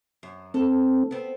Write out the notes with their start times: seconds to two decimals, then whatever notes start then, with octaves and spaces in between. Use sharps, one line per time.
0.23 F#2
0.54 C4 A4
1.11 B3 C4